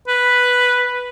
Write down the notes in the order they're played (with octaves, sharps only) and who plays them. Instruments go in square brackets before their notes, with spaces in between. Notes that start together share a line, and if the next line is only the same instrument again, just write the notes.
[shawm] B4